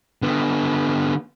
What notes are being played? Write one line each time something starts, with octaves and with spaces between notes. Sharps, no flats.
D3 B3